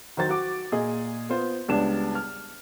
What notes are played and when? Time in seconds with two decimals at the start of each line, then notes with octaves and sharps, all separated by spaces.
0.17 D#3 F#3 C5 A6
0.29 F#4 D6
0.72 A#2 G#4 D#5
1.29 B3 F4 C5
1.68 C#2 G3 B3 D4 A5 E7
2.15 F6